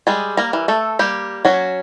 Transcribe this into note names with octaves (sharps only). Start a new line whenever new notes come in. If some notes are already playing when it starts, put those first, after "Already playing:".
G3 G#3 G#4
A#3 A#4
E3
A3 A4
G3 A#3 G4
F#3 C#4 F#4